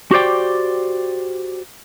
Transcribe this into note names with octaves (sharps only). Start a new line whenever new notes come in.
F#4 G4 C5 D5 G5